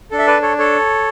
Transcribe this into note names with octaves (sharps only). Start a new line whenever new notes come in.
D4 A4
E5
B4 D5
A4 C#5
A4 C#5